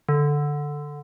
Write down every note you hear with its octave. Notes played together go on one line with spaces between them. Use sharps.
D3